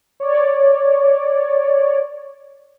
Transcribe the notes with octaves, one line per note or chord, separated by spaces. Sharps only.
C#5 D5